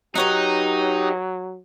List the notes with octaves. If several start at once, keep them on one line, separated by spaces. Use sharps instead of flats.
F#3 D#4 G4 B4 C#5 F#5